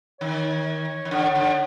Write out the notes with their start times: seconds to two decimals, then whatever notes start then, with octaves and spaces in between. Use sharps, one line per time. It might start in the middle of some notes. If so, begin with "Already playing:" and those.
0.20 D#3 C#5
1.05 D#3
1.11 D3
1.35 D3